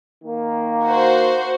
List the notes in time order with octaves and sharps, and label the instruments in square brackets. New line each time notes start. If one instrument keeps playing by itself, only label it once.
[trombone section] D#3 A#3
[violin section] F#4 C5